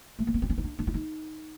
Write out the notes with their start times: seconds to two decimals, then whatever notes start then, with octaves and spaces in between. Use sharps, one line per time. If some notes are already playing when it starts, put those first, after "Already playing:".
0.19 A3
0.27 A#3
0.34 B3
0.42 C4
0.50 C#4
0.58 D#4
0.64 D4
0.79 D4
0.87 E4
0.94 D#4